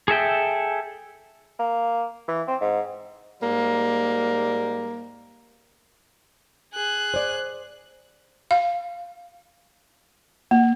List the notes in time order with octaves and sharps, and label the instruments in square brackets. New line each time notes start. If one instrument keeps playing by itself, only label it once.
[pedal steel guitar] G#4 A4 E5 G5
[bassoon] A#3
E3
C4
G#2
[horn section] G#2 G3 A#3
[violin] G#4 F#6
[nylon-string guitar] C5 D5
[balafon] F5
A#3